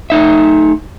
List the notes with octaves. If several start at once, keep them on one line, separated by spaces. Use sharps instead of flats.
A3 D#4 E5